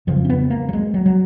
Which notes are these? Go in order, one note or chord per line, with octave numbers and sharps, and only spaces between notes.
F2 C#3 F3
C#4
B3
A#3
F#3
G#3
F#3
F#3